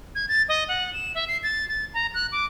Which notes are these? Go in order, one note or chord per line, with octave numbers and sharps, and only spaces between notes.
G#6
A6
D#5
F#5
E7
E5
C7
A6
A6
A#5
F#6
D6